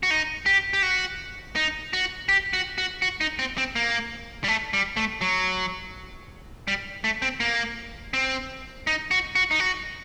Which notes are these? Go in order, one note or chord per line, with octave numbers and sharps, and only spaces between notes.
F#4
D#4
G4
G4
F#4
D#4
F#4
G4
F#4
F#4
F#4
D#4
C4
C4
A#3
G3
A3
G3
A3
F#3
G3
A3
C4
A#3
C4
D#4
F#4
F#4
D#4
F#4